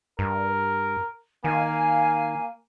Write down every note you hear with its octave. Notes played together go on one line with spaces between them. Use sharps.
G2 A#4
D#3 A#3 F5 G#5